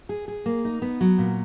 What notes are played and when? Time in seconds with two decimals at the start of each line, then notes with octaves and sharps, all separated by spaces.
0.09 G#4
0.28 G#4
0.46 A#3
0.65 D#4
0.82 B3
1.01 F#3
1.18 A#2